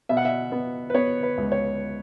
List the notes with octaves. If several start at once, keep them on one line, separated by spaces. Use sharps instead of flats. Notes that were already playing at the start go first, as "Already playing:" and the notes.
B2 E5
F#5
E5
B3
B4
B3 C#5
B4
C#2
C#5